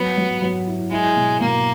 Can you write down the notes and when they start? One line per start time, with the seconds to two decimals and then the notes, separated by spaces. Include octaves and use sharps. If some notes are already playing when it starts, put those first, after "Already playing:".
Already playing: F#3 B3
0.17 F#3
0.42 F#3
0.67 E4
0.91 G#3 E4
1.16 B2
1.40 B2 A#3